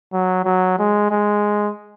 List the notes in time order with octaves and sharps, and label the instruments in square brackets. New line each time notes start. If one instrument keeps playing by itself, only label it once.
[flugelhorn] F#3
F#3
G#3
G#3